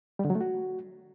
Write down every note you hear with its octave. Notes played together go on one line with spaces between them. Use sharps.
G3
D3
F#3
A3
F#4